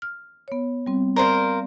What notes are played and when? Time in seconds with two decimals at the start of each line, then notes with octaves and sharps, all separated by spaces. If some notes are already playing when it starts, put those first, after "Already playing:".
0.02 F6
0.48 B3 C#5
0.86 G3 C4
1.16 A#4 C5 D5 F5
1.35 D5